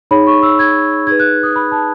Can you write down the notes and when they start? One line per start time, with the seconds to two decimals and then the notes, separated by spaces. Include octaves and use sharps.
0.11 D#4 G#4 C#5 B5
0.27 C#6
0.43 E6
0.59 G#6
1.07 D#4 G#4 B4 G#6
1.20 F#6
1.43 D#6
1.56 B5
1.72 A5